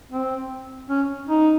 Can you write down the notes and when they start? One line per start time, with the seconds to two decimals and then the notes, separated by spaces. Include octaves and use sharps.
0.12 C4
0.90 C#4
1.29 D#4